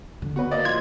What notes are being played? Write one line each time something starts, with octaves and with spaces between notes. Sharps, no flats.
D3
B3 F#4 B4
A#3 D5 D#5 A6
F3 C6 G#6